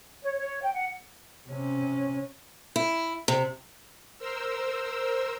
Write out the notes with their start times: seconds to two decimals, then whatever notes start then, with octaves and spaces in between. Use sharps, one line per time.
0.23 C#5
0.38 C#5
0.62 G5
0.75 F#5
1.48 C3 C#4
2.76 E4
3.28 C3
4.19 A#4 C5 E6